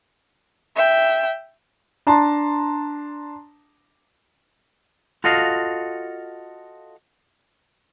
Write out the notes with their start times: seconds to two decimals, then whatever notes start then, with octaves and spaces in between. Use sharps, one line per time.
0.76 E5 G5
2.07 D4 A5 A#5 C6
5.24 F4 F#4 A4 D#5 F5